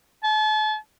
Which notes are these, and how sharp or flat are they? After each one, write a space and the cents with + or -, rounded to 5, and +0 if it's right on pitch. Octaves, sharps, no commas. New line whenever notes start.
A5 -40